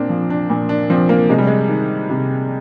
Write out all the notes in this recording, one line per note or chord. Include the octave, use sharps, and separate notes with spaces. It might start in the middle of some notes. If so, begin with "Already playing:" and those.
Already playing: A#2 A#3 C4 D4
F3
D4
A#2
D4
F3 C4
A#3
C3 G#3
G3
G#3
D#3
C3